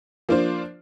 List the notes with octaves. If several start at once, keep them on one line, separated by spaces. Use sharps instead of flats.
F3 A#3 D4 F4 C5